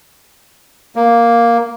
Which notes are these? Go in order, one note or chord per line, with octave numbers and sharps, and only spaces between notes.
A#3